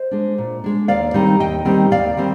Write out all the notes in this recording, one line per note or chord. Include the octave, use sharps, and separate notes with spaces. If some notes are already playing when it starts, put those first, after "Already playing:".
Already playing: C5 D#5
G#3 D4
A#2
G#3 D4
D#2 D5 F5
D#3 G3 C4 D#4
D#2 D#5 G5
D#3 G3 C4 D#4
D#2 D5 F5
D#3 G3 C4